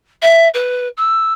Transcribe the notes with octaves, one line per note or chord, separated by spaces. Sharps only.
E5
B4
E6